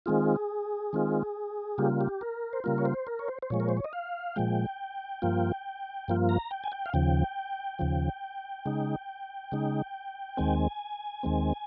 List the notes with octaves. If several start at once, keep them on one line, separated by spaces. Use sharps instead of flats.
D#3 G#3 C4 F4 G#4
D#3 G#3 C4 F4
C#3 G3 A#3 F4 G4
G4
A#4
C5
C#3 G3 A#3 F4 A#4
C#5
C5
A#4
C#5
C5
C5
A#2 F3 G#3 C#5
A#4
C5
C#5
D#5
F5
A#2 F3 G#3 G5
G2 F3 A#3 F4
G2 F3 A#3 F4
A#5
G5
G#5
G5
F5
D#2 C#3 F3 G5
D#2 C#3 F3
C#3 G#3 D#4
C#3 G#3 D#4
D#2 D#3 G#3 C4 G#5
D#2 D#3 G#3 C4